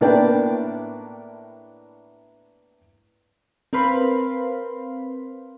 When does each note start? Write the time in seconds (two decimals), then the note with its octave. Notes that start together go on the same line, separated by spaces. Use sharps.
0.01 A2 A#3 B3 D4 D5 G5
3.73 C4 A#4 B4 F5 B5 C6